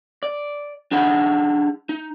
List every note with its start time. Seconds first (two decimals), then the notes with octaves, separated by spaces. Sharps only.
0.23 D5
0.91 D4 D#4 G#4 F#5 B5
1.89 D#4